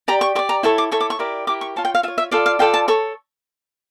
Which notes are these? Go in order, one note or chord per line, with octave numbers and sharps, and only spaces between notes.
G4 D5 A#5
C#6
G4 D5 C#6
A#5
E4 A4 C#5 C#6
D6
E4 A4 C#5 C#6
D6
C#6
E4 G4 A#4 D5
E4 G4 A#4 D6
C#6
F4 C#5 A5
G5
F5
F4 C#5 E5
E5
F4 A4 D5 F5
F5
F4 A4 D5 G5
A5
A4 C#5 C#6